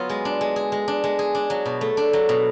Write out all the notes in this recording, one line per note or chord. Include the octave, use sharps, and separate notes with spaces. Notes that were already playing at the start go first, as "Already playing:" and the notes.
Already playing: F#3 B3 F4
G#3
D4
G#3
G#4
G#3
D4
G#3
G#4
D4
F#3
B2
A3
D4
F#3
B2